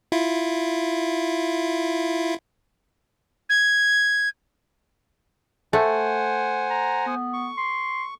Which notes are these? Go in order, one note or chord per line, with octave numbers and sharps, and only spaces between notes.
E4 F4
G#6
A3 C5 F#5 G#5
A#5
B3
C#6
C6